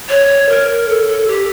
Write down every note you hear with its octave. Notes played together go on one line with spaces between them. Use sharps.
C#5
A#4
A4
A4
G4